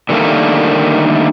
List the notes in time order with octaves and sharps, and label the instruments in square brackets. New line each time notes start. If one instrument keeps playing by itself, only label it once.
[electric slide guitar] D3 D#3 G3 A3 A#3